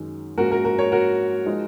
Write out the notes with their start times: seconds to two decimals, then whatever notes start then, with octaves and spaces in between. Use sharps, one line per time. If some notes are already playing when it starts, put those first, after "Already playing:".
Already playing: F#2 D#3 G#3
0.38 G#2 F3 A#3 C#4 F#4 A#4
0.51 F#4 A#4
0.65 F#4 A#4
0.79 A#4 C#5
0.92 F#4 A#4
1.46 F3 G#3 D#4